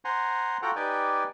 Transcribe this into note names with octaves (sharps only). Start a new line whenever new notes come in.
C5 F#5 G#5 A#5 C6
F4 F#4 A4 F#5 G5 A#5
D#4 G4 B4 D5 G5 G#5